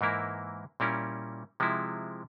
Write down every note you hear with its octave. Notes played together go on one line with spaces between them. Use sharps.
G#2 E3 A#3 E4 A#4
A#2 G3 C#4 E4 A#4
C3 F3 G#3 E4